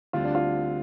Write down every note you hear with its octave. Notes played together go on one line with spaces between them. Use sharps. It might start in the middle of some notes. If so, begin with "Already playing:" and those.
D2 D3 G3 C4 F4
D4
F4